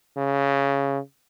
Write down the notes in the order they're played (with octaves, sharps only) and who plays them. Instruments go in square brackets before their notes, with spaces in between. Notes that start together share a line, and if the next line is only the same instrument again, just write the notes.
[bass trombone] C#3